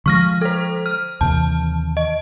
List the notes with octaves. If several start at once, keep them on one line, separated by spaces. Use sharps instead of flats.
D3 F3 G#3 C#6 F6 A#6
A4 C5
F6
D#2 C3 E3 A5
D#5